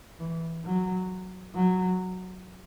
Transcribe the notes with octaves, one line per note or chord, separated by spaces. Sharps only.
E3
F#3
F#3